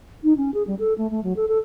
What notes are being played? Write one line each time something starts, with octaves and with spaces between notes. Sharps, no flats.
D#4
C#4
G#4
G3
A4
A3
A3
F#3
A4
A4